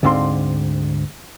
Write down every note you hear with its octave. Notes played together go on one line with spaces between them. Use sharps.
D2 G#2 D3 C4 F5 C6